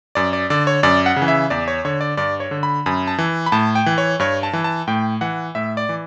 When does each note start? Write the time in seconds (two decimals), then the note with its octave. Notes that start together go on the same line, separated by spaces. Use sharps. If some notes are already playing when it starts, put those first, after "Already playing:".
0.15 F#2 D5
0.33 D5
0.50 D3 D5
0.67 C#5
0.83 F#2 D5
1.06 F#5
1.16 C#3
1.22 E3
1.28 E5
1.50 E2 D5
1.68 C#5
1.85 D3 C#5
2.01 D5
2.17 G2 D5
2.40 C#5
2.51 D3
2.63 B5
2.86 F#2 B5
3.07 A5
3.18 E3
3.46 B5
3.52 A2 A5
3.75 G5
3.86 E3
3.98 C#5
4.19 G2 C#5
4.43 A5
4.53 E3
4.64 A5
4.88 A2 G5
5.21 E3 F#5
5.55 A2 E5
5.77 D5
5.89 E3